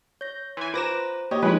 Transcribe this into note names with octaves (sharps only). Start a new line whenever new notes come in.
C#5 G6 A#6
E3 G#5 C6
F4 B4 C5 A#5 D6 A#6 E7
A#3 G4 C#5 D#5
F3 G#3 D#4 B4 C#5 G#5 B5